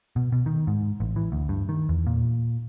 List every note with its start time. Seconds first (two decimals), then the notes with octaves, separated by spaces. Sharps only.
0.16 B2
0.32 B2
0.46 D#3
0.67 G#2
1.00 A1
1.16 E3
1.32 D2
1.49 G2
1.69 D#3
1.89 E2
2.07 A#2